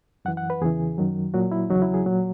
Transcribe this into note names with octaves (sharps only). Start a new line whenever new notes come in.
F#2 E3 F#5
F#5
B4
E2 C#3 E3 G#4
F#2 D#3 F#3
A#2 F#3 F#4
E4
E2 C#3 F#3 D#4
E4
G#4
A#2 F#3